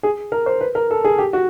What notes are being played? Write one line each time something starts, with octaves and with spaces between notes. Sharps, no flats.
G#4
A#4
C5
B4
A#4
A4
G#4
G4
F#4